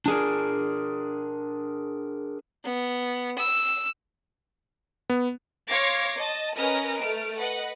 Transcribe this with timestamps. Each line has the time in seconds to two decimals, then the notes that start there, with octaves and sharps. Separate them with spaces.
0.06 D4 G#4 A#4
2.65 B3
3.38 E6
5.10 B3
5.69 C#5 F5 C6 D6 G#6 A#6
6.16 D#5 A5
6.56 C#4 A#4 B4 D#5 F6 A#6
7.00 A3 F6 D7
7.39 B4 D#5 F#5